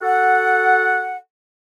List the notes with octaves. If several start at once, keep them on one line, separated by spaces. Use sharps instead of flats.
F#4 A4 F#5